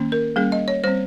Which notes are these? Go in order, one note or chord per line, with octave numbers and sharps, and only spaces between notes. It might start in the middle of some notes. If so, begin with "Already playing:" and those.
Already playing: D#3 A#3 C#4
A#4
G3 A#3 C#4 G#4
D#5
C#5
G3 C4 C5